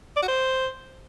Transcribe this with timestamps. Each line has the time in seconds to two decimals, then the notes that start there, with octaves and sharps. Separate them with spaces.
0.16 D5
0.22 F#4
0.28 C5